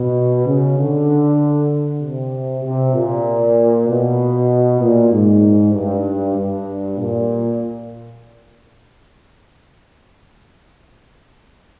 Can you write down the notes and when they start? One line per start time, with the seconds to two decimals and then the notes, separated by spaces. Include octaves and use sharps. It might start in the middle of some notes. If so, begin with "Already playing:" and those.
Already playing: B2
0.46 C#3
0.77 D3
2.01 C3
2.63 C3
2.94 A#2
3.88 B2
4.81 A#2
5.12 G#2
5.74 G2
6.36 G2
6.98 A#2